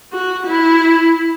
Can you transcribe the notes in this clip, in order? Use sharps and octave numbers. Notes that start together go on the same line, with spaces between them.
F#4
E4